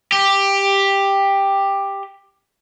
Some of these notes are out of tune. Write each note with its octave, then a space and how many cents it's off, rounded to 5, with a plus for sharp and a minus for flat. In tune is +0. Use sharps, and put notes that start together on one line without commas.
G4 +10